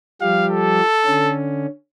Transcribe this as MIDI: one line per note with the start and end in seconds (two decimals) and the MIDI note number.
0.21 0.80 53
0.21 0.80 55
0.21 0.80 67
0.21 0.46 77
0.52 1.35 69
1.06 1.66 50
1.06 1.66 61